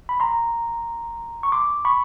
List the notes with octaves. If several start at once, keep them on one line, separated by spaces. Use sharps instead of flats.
B5
A#5 C6
C#6
C6 D6
B5 C#6